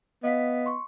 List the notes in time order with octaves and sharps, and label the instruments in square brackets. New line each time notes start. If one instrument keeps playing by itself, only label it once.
[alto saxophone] B3 [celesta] D#5 F5 B6
[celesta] C6 C#6